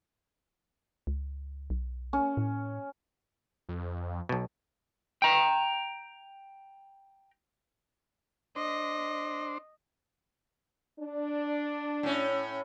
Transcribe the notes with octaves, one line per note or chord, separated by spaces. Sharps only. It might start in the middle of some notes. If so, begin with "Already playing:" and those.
C#2
B1
C#4
A2
F2
B1 B2
G5 A#5
D4 C5 D#5
D4
A2 C#4